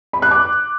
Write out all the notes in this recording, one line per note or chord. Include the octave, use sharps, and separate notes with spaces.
B5
F#6
D6